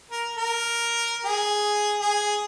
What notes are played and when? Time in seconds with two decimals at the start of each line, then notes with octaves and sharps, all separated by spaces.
0.11 A#4
0.37 A#4
1.25 G#4
2.00 G#4